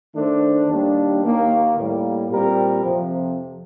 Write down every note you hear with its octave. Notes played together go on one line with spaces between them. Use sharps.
D#3 A3 D4 A4 C5
D#2 D#3 G3 A#3 D4
D#2 D#3 A#3
A2 G3 A#3
A#2 G3 C4 G4 A#4
F2 C3 F3